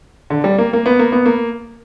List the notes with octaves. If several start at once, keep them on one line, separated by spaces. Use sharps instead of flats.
D3
G3
A#3
A#3
B3
A#3
B3
A#3